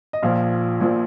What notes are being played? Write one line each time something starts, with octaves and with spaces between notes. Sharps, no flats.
D#5
A#1 A#2 F3 F5
A#1 A#2 F3